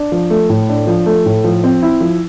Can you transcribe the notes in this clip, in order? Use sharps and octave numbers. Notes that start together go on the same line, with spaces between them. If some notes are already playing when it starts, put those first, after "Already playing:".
Already playing: D4
F3
A3
A2
D4
F3
A3
A2
F3
C4
E4
F3